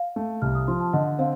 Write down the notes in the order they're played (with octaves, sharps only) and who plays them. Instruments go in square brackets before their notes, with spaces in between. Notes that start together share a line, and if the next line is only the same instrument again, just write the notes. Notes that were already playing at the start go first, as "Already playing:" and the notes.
Already playing: [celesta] F5
[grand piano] A3
[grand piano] C2 [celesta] F6
[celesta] D#6
[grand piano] F3 [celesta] C6
[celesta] A5
[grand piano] D3 [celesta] D#5
[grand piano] C4 [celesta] F5